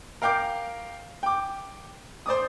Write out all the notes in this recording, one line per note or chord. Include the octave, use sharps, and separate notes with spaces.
A#4 F5 G5 D6 G6
G5 D6
C5 D5 D6 D#6